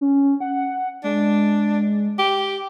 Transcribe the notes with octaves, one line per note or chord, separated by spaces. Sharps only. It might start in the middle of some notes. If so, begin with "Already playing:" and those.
C#4
F#5
G#3 D4
G4